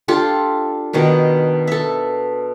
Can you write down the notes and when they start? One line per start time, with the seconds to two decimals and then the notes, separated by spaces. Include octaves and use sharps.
0.08 D4 F4 G4 A4
0.93 B2 D#3 D4 A#4
1.67 A4 E5